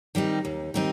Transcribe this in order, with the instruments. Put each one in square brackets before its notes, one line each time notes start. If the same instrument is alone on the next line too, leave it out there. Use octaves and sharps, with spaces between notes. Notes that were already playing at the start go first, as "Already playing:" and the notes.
[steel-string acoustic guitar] D#3 G3 C4 D#4
D#2
D#3 G3 C4 D#4